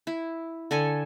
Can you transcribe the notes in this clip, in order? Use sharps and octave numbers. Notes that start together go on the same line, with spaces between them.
E4
D3 A4 G#5